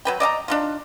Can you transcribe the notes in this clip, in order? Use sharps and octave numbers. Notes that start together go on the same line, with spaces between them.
F#3 B4 G5
D5 D#5 F5 A#5
D4 D#4 F4